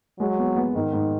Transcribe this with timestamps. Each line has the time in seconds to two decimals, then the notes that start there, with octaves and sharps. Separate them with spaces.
0.19 F#3 G#3
0.39 B3
0.56 B3
0.75 G#2 D#3
0.93 G#2